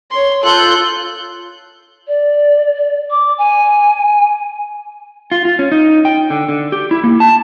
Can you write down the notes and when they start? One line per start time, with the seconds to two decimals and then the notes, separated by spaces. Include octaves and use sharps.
0.11 C#5 C6
0.44 F4 A4 F#6 G6
2.08 D5
3.10 D6
3.38 G#5
5.32 F4
5.45 F4
5.59 C#4
5.72 D#4
6.05 G5
6.30 D3
6.49 D3
6.72 G4
6.91 E4
7.04 A#3
7.20 A5